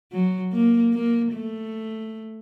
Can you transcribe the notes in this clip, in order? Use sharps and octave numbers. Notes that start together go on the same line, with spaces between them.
F#3
A#3
A#3
A3